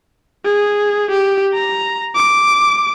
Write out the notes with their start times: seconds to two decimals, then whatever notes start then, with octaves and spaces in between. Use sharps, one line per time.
0.45 G#4
1.11 G4
1.54 A#5
2.15 D6